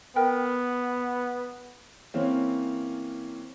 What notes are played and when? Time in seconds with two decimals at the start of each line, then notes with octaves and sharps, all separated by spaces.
0.16 B3 A#4 G5
2.14 E3 A#3 C4 C#4